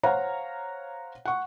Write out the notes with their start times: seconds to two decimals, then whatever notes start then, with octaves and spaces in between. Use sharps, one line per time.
0.03 C5 C#5 F5 F#5 A#5
1.25 F#5 C#6